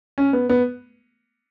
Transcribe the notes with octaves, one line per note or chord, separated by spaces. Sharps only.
C#4
B3
B3